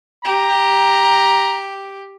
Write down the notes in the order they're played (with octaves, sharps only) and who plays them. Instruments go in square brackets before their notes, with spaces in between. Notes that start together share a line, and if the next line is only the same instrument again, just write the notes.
[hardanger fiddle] G4 [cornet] A#5